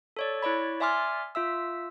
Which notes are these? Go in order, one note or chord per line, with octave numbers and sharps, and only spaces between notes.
A4 C#5 D5
E4 C#5 D5 B5
D5 E5 G#5 C6 D6 F6
F4 E5 E6